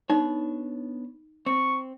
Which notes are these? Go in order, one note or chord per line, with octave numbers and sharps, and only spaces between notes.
B3 D4 D#4 C#5
C4 C#6